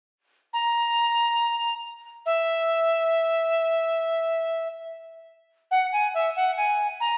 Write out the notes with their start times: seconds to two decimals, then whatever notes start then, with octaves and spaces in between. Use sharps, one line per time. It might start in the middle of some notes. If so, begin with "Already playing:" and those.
0.53 A#5
2.26 E5
5.71 F#5
5.92 G#5
6.14 E5
6.36 F#5
6.57 G#5
7.00 A#5